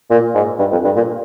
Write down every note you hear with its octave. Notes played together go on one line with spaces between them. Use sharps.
A#2
G#2
G2
F2
G2
A#2